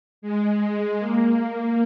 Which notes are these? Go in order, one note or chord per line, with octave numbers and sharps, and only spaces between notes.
G#3
G#3
A#3